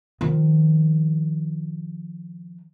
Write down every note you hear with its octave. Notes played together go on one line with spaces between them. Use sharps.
D#3 F3